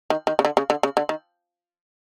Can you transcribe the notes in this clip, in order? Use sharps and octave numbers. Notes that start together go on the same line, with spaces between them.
D#3
D#3
C#3
D3
C#3
D3
C#3
D3
D#3